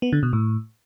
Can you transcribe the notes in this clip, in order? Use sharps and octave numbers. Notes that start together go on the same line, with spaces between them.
B3
D3
B2
A2